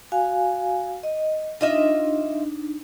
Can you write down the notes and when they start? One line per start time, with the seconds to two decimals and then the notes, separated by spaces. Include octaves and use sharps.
0.12 F#4 F5 G#5
1.03 D#5
1.61 D4 D#4 F4 D#5 E5